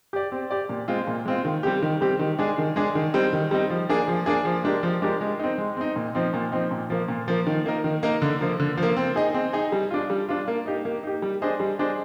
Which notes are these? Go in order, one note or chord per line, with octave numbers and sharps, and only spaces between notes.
G4 D5
C4
G4 D5
A#2
G#3 C4 F4
A#2
G#3 C4 F4
D#3
G3 C4 G4
D#3
G3 C4 G4
D#3
G#3 D4 G#4
D#3
G#3 D4 G#4
D#3
G3 C4 D#4
D#3
G3 C4 D#4
F3
A#3 D4 G#4
F3
A#3 D4 G#4
F3
G#3 D4 G4 A#4
F3
G#3 D4 G4 A#4
G#3
C4 D#4
G#3
C4 D#4
A#2
F3 C4 D#4
A#2
F3 C4 D#4
A#2
F3 A#3
A#2
F3 A#3
D#3
A#3 D#4 A#4
D#3
A#3 D#4 A#4
D3
F3 A#3
D3
F3
A#3
C4
D#4 G#4 D#5
C4
D#4 G#4 D#5
G3
D4 F4
G3
D4 F4
A#3
D#4 G4
A#3
D#4 G4
G3
D4 G#4 C5 D#5
G3
D4 G#4 C5 D#5